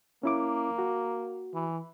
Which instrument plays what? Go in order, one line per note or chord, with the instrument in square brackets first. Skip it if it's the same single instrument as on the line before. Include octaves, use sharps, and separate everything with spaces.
[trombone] A#3 [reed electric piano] C#4 E4 D6
[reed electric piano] F#4
[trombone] E3